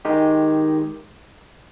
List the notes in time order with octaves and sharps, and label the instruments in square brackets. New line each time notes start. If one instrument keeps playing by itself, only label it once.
[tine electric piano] D#3 G#3 D#4 G4